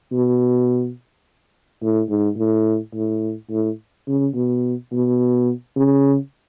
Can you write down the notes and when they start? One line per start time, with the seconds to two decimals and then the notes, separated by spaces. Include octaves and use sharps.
0.13 B2
1.82 A2
2.09 G#2
2.38 A2
2.94 A2
3.50 A2
4.08 C#3
4.35 B2
4.92 B2
5.76 C#3